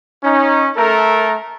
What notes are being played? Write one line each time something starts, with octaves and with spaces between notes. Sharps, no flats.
C#4 D#4
A3 A4 A#4